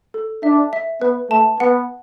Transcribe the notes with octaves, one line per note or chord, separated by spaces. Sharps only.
A4
D4 E5
E5
B3 B4
A3 A5
B3 F#5